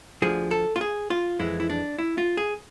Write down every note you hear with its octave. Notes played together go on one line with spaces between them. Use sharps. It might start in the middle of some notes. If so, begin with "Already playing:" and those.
D2 D3 F3 G#4
A4
F4
G#4
F4
F2 E3 G#3 E4
E4
D4
E4
F4
G#4